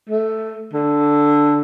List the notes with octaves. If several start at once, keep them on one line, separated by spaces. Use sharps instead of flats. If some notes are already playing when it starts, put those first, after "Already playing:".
A3
D3